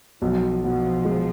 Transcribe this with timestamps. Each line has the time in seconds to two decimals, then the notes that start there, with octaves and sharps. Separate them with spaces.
0.21 B1 F3
0.64 B2 F3
1.05 G#3